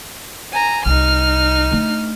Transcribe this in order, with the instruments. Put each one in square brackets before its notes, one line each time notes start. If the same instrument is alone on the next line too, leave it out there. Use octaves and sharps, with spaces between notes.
[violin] G#5 A#5
[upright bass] C2 [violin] D#4 F6
[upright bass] A3 D4